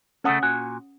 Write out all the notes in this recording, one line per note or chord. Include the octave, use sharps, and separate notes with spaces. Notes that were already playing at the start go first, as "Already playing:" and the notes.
C#3 A3 C#4 A4 F#5 D#6
A#2 F#4 G#5